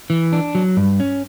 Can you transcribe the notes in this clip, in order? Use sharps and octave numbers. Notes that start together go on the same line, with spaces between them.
E3
D4
F#3
G2
C#4